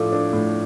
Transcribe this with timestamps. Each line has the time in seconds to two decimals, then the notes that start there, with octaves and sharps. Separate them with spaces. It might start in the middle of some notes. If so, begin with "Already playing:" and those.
Already playing: A2 F3 A3 D4 D6
0.13 D4
0.33 A2